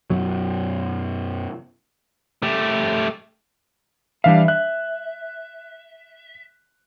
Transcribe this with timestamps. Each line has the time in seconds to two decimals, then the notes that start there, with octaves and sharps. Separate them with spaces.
0.10 F#2 B2 F#3
2.42 A3 G4
4.24 E3 G3 D4 E5 F5
4.48 E5 F#6